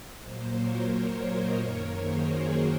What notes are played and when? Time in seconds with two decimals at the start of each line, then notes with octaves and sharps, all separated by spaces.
0.22 A#2 F#3 A#3 C5 D#5
0.56 A#4 C#5
0.91 A#4 C#5
1.25 C5 D#5
1.60 F#2 D#3 A#3 A#4 C#5
1.94 G#4 C5
2.29 F#4 A#4